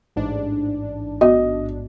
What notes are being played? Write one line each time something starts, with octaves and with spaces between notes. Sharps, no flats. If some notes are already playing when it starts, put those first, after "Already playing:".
A1 G#2 D4
B3 F#4 D#5